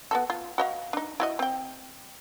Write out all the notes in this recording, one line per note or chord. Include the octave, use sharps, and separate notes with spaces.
B3 F#4 A4
F4
F#4 D#5 F5
D4 D#4
E4 F#4 D#5
C4 G5